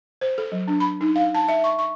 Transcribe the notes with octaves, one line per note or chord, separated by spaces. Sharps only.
C5
A4
F#3
D4
B5
D#4
F5
A5
E5
C#6
C#6